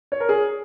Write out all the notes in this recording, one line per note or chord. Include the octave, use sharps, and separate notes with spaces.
C#5
A#4
G#4